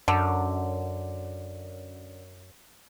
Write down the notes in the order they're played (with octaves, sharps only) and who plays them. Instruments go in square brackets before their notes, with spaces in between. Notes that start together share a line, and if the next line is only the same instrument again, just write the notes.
[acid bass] F#2 [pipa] D3